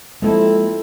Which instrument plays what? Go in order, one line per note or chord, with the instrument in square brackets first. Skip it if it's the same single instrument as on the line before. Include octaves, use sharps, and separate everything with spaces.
[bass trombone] F2 [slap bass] G#3 A#3 [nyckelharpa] C4 E4 [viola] A4